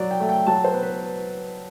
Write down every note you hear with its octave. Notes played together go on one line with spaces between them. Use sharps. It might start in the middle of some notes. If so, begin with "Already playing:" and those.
Already playing: F#3 D5
G5
A3
G5
F#3 A5
C5
B3
B4